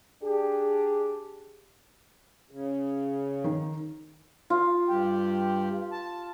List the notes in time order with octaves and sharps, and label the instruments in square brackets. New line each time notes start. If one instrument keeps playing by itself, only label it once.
[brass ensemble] D4 G4 G#4
[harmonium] C#3
[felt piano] D#3
[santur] F4
[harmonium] G2 G4
A5